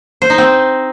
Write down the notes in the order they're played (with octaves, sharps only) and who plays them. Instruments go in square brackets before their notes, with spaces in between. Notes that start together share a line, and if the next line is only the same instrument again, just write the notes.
[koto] C5
D#4
C4